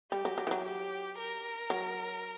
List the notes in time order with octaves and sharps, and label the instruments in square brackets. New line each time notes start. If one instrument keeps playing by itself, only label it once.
[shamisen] G3 [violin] G4
[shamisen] F#3
F#3
E3
F#3
[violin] G4
A#4
[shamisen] F#3